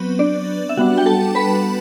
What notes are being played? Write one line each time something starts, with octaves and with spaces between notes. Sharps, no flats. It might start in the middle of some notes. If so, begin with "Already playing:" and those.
Already playing: F#3 B3 C4 B4
D4 D5
E5
G3 B3 D4 F#4 F#5
G5
A4 A5
B4 B5